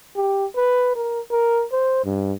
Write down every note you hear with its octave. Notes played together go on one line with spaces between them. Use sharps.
G4
B4
A#4
A#4
C5
G2